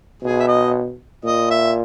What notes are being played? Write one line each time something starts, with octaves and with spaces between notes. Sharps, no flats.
B2 G#4
E5
D#5
A#2 D#5
E5